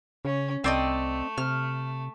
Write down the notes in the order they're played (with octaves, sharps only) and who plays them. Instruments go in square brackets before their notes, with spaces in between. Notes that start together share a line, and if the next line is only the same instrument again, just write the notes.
[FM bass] C#3 [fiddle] C#4
[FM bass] C2 [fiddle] A3 [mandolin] C4 D5 D#5
[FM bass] C3 [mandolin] F6